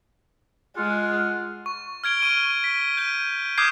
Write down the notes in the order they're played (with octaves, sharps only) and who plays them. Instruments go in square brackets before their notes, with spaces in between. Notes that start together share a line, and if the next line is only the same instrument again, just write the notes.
[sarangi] G#3 [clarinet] F4 [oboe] F#5 [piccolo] F6
[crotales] C#6
F6 G#6 D7 G7
C#6 D#7
B6
G6 D#7
D6 D#6 F6 G6 G#6 C7